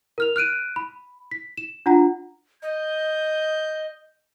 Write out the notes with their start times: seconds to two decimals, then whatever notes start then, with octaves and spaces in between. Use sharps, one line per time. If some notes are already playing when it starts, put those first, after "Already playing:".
0.18 A#4 F6 F7
0.36 F6 F#6 D7 D#7
0.76 B5
1.31 B6
1.58 E7
1.86 D4 F4 F#5 A#5
2.63 D#5 G6